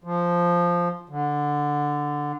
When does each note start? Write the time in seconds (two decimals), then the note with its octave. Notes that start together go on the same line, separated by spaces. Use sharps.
0.04 F3
1.09 D3